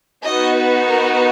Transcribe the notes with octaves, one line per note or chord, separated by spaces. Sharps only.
B3 D#4 F#4 D#5
B4
A#4